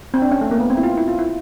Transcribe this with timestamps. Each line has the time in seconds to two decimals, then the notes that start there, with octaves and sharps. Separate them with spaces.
0.14 C4
0.22 D4
0.31 C#4
0.41 A3
0.51 A#3
0.60 B3
0.70 C4
0.77 E4
0.83 F4
0.97 E4
1.08 F4
1.19 E4